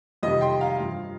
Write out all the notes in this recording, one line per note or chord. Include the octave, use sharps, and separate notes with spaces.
F2 C3 D#3 G3 D#5
G5 C6
F5 A#5
G2 F3